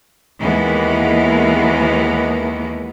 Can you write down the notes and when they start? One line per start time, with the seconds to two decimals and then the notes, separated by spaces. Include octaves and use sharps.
0.40 D#2 E3 G#3 B3